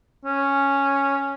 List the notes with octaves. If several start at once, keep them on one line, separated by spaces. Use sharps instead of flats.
C#4